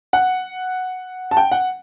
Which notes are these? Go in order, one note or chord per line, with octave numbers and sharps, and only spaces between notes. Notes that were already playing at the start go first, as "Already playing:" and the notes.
F#5
A5
G5
F#5